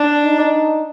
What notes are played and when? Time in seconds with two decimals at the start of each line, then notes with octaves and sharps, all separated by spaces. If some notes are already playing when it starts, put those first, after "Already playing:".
Already playing: D4
0.24 D#4